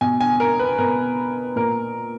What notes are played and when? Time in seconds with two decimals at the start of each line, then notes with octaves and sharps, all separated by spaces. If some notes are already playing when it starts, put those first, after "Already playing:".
0.01 B2 G#5
0.21 G#5
0.40 A#4
0.59 B4
0.78 B2 A#4
1.56 A#2 A#4